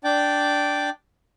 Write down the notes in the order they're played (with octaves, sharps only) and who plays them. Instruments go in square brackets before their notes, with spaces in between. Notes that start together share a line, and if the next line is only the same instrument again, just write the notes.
[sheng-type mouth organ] D4 D5 G5 D6